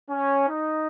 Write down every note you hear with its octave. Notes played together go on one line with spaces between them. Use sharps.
C#4
D#4